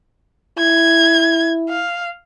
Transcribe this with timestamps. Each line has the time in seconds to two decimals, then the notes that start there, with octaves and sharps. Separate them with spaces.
0.58 E4 G#6
1.69 F5